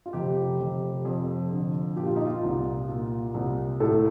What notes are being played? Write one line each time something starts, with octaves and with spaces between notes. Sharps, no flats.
F4
F1 G4
F1
F2
D3
A#2 G4
F4
D#4
F4
C2
A#2
C2
A2 A4